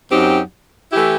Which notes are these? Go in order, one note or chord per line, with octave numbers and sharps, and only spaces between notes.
F#2 F#3 C4 D#4 G4
E3 A3 E4 G4